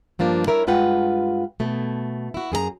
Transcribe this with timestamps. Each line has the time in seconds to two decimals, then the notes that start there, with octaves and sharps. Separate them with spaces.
0.19 G2 F3 A#3 D4
0.47 E4 A#4 C#5 E5
0.67 G2 G#3 F4 B4 F#5 G5
1.60 B2 A3
2.34 E4 F#4
2.52 F#2 G#4 A4 A#5